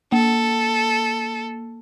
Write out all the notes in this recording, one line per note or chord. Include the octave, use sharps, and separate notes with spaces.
A#3 A4